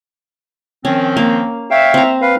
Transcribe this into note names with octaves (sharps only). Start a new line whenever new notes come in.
D#3 F3 C4 C#4
A#3
C#5 E5 F5 G5
C4 A#5
B4 F5